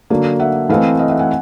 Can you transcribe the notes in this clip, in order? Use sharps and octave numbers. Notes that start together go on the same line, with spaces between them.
D3 F#3 A#3
E5 F#5
E3 A3 C4 D#5 F5
D#5 F5
E5 F#5
F#5 G#5